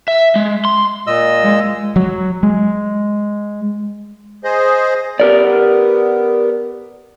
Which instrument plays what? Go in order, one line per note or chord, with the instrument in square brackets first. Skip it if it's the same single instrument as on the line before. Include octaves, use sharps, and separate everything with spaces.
[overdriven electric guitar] E5
G#3
C6
[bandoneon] A#2 D#5 E6
[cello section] G#3
[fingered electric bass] F#3
G#3
[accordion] G#4 C5 D#5
[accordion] B3 [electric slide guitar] G4 A#4 D5